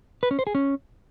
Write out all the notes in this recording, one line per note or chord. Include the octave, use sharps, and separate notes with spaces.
B4
C#4
C5
G#4
C#4